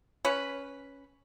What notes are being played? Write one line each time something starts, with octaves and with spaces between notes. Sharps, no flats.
C#4 B4